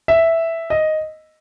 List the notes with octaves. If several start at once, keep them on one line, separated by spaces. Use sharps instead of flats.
E5
D#5